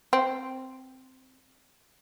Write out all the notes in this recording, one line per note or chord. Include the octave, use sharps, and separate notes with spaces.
C4